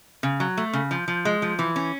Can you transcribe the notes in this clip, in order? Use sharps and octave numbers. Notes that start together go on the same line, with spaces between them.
C#3
F#3
A3
C#3
F3
F3
G#3
F3
E3
C#4